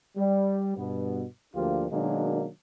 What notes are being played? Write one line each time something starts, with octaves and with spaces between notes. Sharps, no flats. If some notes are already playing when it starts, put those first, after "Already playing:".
G3
G2 B2 B3
D2 F3 A#3 D4 F4 G4
B2 D#3 F#3 G#3 A#3 D4